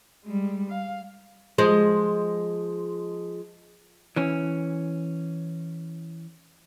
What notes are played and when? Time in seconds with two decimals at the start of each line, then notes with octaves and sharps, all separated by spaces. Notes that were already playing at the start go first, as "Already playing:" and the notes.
0.24 G3 G#3
0.71 F5
1.58 F3 G#3 C5
4.16 E3 C#4